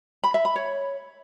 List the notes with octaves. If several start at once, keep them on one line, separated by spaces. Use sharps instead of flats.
B5
E5
B5
C#5